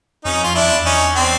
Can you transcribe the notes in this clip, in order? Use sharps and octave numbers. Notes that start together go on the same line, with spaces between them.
F2 C#4 D#4
F4
D4 E4
F2
E2
C#4 D#4
C4 D4